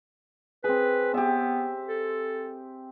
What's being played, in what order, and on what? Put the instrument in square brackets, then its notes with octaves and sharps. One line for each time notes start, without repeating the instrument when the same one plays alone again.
[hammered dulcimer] C4 G#4 [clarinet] B4
[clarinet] B3 [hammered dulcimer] G4 E5
[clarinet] A4